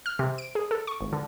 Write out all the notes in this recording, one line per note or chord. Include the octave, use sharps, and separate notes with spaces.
F6
C3
D7
G#4
A4
C#6
G#1
D3